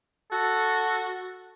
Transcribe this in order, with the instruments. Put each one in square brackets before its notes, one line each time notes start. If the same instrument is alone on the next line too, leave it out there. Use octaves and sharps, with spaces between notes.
[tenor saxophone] F#4 [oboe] A4